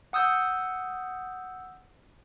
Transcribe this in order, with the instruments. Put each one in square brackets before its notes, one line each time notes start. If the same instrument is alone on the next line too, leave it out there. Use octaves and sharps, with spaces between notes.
[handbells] F#5 D#6 E6 G6